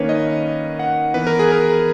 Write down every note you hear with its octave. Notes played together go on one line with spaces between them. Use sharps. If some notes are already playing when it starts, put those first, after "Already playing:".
Already playing: D#3 A#3 C#4 B4 C#5
D#5
F#5
E3 B3 B4
A#4
G#4
A#4